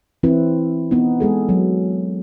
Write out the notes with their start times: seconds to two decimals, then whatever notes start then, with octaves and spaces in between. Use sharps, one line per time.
0.23 E3 C4 E4 B4
0.91 B3 D#4
1.20 G#3 G#4 A4
1.49 F#3